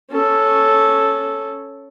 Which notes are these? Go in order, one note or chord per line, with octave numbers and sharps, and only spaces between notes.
C#4 A4